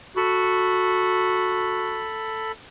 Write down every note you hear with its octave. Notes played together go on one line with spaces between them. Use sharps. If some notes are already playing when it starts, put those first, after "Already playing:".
F#4 A4 B5